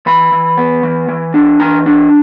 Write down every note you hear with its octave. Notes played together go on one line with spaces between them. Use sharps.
E3 B5
E3
B3
E3
E3
D4
E3 A#5
D4